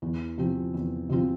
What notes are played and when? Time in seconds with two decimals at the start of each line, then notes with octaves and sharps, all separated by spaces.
0.02 E2
0.38 C3 F3 C4 F4
0.74 E2
1.09 C3 F3 C4 F4